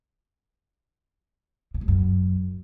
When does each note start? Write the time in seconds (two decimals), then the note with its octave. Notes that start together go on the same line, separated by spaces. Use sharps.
1.74 C#3
1.81 G2
1.88 F#2